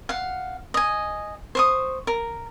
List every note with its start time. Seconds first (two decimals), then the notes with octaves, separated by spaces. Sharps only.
0.09 F5 F#5
0.74 D#5 G#5
1.55 C5 C#6 D#6
2.07 A#4